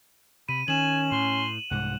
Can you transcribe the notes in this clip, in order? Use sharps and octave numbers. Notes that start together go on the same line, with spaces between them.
C3 B5 D#7
D#3 C#4 G#5 E7 F#7
A2 C6
C2 G#2 F#5